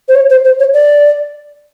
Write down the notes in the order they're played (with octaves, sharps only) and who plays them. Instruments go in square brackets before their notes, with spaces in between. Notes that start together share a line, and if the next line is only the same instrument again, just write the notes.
[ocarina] C5
C#5
C5
C5
C#5
D5